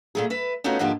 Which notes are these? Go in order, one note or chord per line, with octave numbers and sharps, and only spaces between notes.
A#2 A3 G#4
B4 E5
A3 B3 C#4 D#4 F4 F#4
G#2 D3 F3 A#3 G4